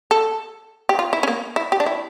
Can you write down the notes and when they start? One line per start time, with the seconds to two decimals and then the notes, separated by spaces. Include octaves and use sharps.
0.11 A4
0.89 G4
0.99 F4
1.13 E4
1.23 C#4
1.28 A#3
1.56 E4
1.72 G4
1.80 D4
1.86 E4